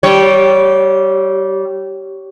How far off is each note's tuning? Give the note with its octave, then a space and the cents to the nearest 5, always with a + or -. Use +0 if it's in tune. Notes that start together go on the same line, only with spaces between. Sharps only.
G3 -20 C#5 +0